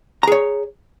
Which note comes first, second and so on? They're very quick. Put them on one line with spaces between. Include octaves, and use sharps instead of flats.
A#5 G#4 C#5